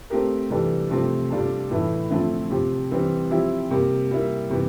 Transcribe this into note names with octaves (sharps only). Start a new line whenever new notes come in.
A3 C4 G4 A#4
C3 E3 G3 D4 A4
C3 F3 A3 C4 G4
C3 G3 D4 F4 A4
A2 E3 A3 E4
D3 F3 A3 C4 E4
C3 F3 C4 G4
E3 G3 C4
F3 C4 E4 G4
C3 G3 A#3
G3 A#3 E4
C3 E3